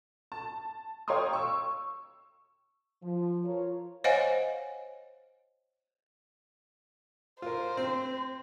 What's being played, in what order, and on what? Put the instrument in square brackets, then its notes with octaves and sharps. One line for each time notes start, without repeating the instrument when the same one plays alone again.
[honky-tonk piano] A5
C#5 F5 G5 A#5 C6 D#6
C#6 E6
[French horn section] F3
F4 A#4 C#5
[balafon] C5 C#5 D#5 F5 F#5 G#5
[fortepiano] F4 A#4 [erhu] C5
[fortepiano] C4